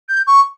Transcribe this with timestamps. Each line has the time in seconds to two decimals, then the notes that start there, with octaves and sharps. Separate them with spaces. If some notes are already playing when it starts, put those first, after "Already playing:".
0.09 G6
0.27 C#6